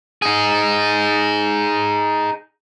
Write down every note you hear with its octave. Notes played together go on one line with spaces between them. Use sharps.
D#4 G#4